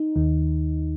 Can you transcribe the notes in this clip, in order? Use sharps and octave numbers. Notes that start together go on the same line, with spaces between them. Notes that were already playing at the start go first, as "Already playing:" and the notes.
Already playing: D#4
D#2 D#3